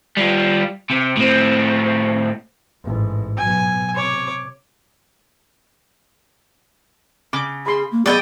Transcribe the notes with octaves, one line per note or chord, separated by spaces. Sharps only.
G3 F4
C3
A2 C4
A1 G#2
B2 F#3 G#5
C3 C#5 D6
C#3 D6
G#4 B5 C6
A#3
F#3 B3 G#4 D5 D#5 G5